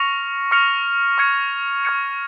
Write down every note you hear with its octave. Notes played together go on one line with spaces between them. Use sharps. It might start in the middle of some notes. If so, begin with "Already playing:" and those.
Already playing: C#6 F6 A#6 C#7 F7
C#6 F6 A#6 C#7 F7
C#6 F6 G#6 C#7
C#6 F6 G#6 C#7